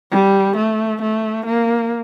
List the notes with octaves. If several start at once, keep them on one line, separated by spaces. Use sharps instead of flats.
G3
A3
A3
A#3